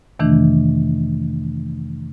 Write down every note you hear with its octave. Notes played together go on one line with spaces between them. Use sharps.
F2 C3 D#3 E3 A3 D4